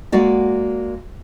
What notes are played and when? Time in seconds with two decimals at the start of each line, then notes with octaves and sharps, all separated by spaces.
0.12 G#3 A#3 F#4 D5